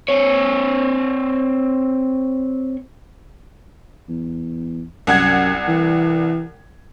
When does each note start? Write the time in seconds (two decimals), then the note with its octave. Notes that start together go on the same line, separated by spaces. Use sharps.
0.08 C4 C#5
4.08 E2
5.07 C2 F#2 F#5 G#6
5.68 E3